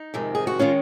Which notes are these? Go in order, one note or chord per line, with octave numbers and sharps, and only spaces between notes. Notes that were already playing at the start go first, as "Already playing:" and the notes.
Already playing: D#4
F2 C3 D#3 G#3
G#4
F#4
D#3 G#3 C#4 F4